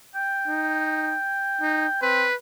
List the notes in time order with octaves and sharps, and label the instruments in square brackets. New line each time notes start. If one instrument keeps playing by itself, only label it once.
[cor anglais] G5
[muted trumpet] D#4
D#4
[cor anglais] C4 [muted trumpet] B4